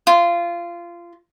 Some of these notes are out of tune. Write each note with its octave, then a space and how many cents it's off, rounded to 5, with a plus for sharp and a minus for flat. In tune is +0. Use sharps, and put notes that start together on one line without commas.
F4 -20